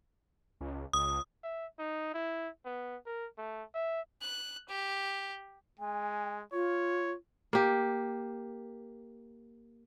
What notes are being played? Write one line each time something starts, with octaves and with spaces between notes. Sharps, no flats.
C#2
C#2 D#6
E5
D#4
E4
B3
A#4
A3
E5
F#6
G4
G#3 G#5
F4 C#5
A#3 G4